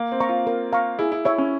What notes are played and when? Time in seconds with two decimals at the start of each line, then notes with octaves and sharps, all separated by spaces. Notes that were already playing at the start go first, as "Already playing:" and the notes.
Already playing: A#3
0.12 C4
0.20 F5 A#5 C#6
0.29 F4
0.47 A#4
0.73 F5 A#5 C#6
0.99 E4 G#4
1.12 E4
1.25 E4 C#5 E5
1.38 C#4